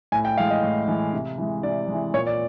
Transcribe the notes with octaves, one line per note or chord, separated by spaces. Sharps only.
A2 G#5
G5
E3 G#3 F5
D#5
A2
E3 G#3
C3
E3 G#3
C3 D5
E3 G#3
A#2 C#5
D5